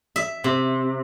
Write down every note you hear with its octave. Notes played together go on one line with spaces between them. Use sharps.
E5
C3